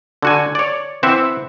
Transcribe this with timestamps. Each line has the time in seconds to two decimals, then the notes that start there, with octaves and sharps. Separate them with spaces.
0.22 D3 F#4 G#5
0.55 C#5 D5
1.03 E3 C4 E5 F#5